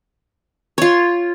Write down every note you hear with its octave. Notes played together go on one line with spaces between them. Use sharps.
F4 C#5